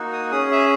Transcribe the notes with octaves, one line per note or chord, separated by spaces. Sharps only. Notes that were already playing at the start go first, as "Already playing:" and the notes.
Already playing: A#3 D#4 F#4
D#6
C#4 G#4 D#6
E5